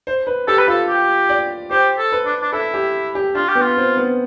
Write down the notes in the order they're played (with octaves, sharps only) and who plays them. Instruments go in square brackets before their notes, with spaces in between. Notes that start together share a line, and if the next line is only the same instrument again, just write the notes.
[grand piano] C5
B4
[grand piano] G4 [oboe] A4
[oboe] B4
[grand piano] F4 [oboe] A4
[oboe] G4
[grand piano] D5
[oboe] G4 [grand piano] C5
[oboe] A4
[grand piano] B4
[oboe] D4
D4
[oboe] E4 [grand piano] A4
[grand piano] G4
G4
[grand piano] D4 [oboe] F4
[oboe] G4
[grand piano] B3
[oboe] F4
[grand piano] C4
B3